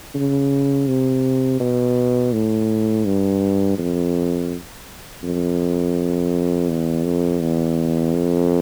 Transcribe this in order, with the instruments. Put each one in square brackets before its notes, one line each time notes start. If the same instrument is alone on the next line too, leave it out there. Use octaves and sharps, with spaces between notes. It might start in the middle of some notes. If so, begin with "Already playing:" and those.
[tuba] C#3
C3
B2
A2
G2
F2
F2
E2
F2
E2
F2